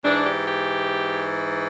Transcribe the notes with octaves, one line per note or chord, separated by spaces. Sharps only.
G#2 E3 D4
G4
G4